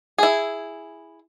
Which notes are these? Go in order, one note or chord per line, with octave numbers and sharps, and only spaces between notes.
E4 G#4